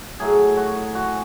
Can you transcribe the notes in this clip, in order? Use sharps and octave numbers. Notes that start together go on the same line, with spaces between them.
A2 F#3 G#4
F#4
F#4